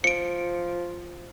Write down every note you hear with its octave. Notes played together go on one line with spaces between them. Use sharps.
F3 C#7 D7